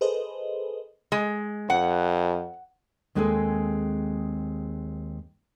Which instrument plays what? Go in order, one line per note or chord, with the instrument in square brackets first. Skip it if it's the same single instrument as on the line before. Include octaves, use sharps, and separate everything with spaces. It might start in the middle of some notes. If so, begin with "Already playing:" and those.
[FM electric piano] G#4 A4 B4 C5 D#5
[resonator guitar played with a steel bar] G#3
[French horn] F2 [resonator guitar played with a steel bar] F#5
[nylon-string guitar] D#2 G#3 C4 G#4 A4 G#5